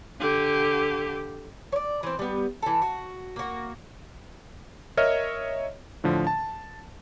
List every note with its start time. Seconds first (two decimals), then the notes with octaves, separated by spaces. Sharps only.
0.20 D3 G4
1.72 C#5 D5
2.03 E3 C4
2.19 G3 B3
2.62 E3 A4
2.82 F#4
3.36 A#3 F#4
4.97 A#4 C#5 D#5 E5 F6
6.04 A2 D3 F3
6.27 A5